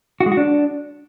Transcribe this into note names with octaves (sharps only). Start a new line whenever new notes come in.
F#4
G#3
F#4
D4